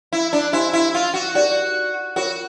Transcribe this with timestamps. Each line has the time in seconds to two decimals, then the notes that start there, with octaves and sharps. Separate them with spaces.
0.12 E4
0.33 D4
0.53 E4 G4 C5 D#5 G#5 C6
0.73 E4
0.94 F4
1.14 F#4
1.34 D#4 F#4 G4 A#4 D5
2.16 F4 F#4 A#4 C#5